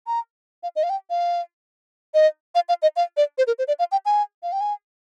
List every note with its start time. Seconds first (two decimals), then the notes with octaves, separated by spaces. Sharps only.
0.07 A#5
0.63 F5
0.76 D#5
0.83 F5
0.90 G5
1.10 F5
2.14 D#5
2.55 F5
2.69 F5
2.82 D#5
2.96 F5
3.17 D5
3.38 C5
3.47 A#4
3.59 C5
3.68 D5
3.79 F5
3.92 G5
4.06 G#5
4.43 F5
4.52 G5
4.61 G#5